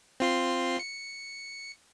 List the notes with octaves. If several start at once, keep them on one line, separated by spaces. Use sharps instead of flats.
C4 F4 C6
C#7